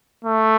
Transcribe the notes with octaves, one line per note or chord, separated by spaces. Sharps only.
A3